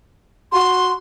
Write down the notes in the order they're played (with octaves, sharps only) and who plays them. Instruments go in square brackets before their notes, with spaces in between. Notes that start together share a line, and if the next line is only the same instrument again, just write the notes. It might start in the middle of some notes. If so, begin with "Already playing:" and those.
[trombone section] F#4 [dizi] C6